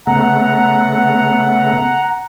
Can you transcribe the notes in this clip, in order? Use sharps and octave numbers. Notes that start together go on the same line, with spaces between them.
C#3 A3 B3 F#5 A#5